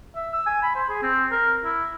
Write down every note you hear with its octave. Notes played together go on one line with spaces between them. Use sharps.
E5
E6
G#5
B5
C5
G#4
C4
A#4
E4